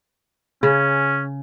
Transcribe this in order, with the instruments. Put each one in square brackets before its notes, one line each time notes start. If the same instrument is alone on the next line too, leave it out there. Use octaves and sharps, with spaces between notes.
[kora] C#3 [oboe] C#4